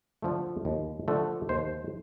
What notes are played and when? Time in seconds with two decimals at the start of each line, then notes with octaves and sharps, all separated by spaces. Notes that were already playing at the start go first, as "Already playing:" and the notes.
0.22 D3 F3 A3
0.65 D#2
1.08 D3 F3 A3
1.49 D#2 C5